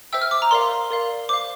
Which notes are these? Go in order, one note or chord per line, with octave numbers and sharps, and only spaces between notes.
C5 E5 G5 E6
F6
D6
A#5
A#4 D5 F5 C6
A#4 D5 F5
C5 F5 D6